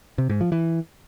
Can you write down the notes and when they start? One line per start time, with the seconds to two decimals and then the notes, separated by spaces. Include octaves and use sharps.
0.18 C3
0.29 G#2
0.41 F3
0.52 E3